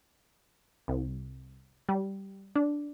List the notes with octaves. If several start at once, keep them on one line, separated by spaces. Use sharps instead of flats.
C2
G3
D4